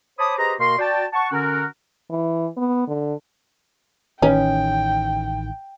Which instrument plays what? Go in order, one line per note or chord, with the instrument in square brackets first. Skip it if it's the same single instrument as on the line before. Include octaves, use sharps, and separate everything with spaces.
[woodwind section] C5 C#5 A5 B5 D6 D#6
G4 G#4 B4 C5 D#5 A#5
B2 A#3 F#4 A#4 C6
F#4 D5 G5 A5
F#5 A5 C#6
D3 C#4 F#4 A#4
[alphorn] E3
B3
D3
[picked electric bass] A1 D#3 [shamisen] C#4 B4 [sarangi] G5